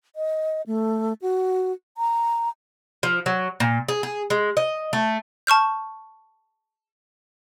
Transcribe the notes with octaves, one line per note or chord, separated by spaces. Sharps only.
D#5
A3
F#4
A#5
F3
F#3
A#2
G#4
G#4
G#3
D#5
A3
A5 C#6 F6 G6